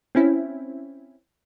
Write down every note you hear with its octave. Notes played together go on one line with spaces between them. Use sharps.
C4 C#4 E4